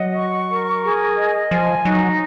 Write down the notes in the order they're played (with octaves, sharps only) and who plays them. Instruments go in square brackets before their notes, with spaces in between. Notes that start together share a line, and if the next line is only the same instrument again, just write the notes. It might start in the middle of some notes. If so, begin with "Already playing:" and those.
Already playing: [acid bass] F#3 [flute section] D#5 F#5
[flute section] C#6
A#4
G#4
D#5
[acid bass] F3 [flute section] G#5
[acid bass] F#3 [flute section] D#4